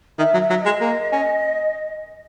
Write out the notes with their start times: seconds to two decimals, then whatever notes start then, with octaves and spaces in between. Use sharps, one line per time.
0.18 D#3 E5
0.34 F#3
0.39 E5
0.50 F#3
0.60 D#5
0.65 G#3
0.81 A#3
1.12 C#4